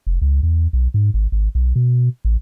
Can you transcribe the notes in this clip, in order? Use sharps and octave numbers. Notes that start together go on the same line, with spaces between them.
F1
C#2
E2
B1
G#2
G#1
G#1
B1
B2
A1